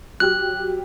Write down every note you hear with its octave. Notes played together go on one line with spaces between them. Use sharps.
F#3 G4 F6 F#6